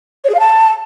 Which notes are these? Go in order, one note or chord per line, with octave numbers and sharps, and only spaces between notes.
C#5
G#4
F5
A5